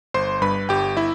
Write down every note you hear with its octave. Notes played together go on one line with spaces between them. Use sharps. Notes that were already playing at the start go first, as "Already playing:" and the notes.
G1 C5 C6
G2 B4 B5
G1 G4 G5
E4 E5